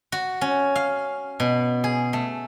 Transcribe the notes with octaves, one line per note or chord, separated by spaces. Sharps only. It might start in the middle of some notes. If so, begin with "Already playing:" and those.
F#4
C#4
F5
B2
G#4
A3